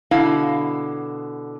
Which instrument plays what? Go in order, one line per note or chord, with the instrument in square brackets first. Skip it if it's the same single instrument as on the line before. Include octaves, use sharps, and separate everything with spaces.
[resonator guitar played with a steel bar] B2 D3 E4 F5